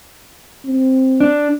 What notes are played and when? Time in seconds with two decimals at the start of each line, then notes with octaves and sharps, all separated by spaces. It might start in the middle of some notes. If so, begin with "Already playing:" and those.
0.66 C4
1.20 D4